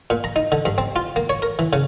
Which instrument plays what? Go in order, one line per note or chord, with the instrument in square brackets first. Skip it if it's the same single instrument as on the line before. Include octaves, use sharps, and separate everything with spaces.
[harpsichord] A#2
A#5
D#4
D3
G2
C4
F4
A#3
C#5
A#4
E3
C#3